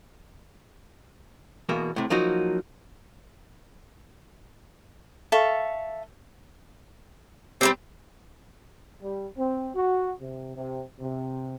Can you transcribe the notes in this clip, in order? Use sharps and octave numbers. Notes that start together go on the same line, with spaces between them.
E2 B2 A#3
A2 C3
F3 F#3 A#3 D#4 F#4
A4 E5 F5 C#6
G3 A#3 C4 G4
G3
C4
F#4
C3
C3
C3